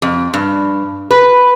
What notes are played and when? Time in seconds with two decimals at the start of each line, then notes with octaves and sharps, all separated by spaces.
0.02 F2
0.34 G2
1.11 B4